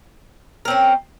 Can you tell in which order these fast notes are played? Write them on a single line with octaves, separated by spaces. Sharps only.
A#4 C4 C#4